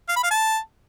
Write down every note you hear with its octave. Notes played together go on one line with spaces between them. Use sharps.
F5
B5
F5
A5